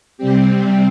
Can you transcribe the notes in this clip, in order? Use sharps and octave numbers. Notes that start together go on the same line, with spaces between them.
C3 G3 C4 G4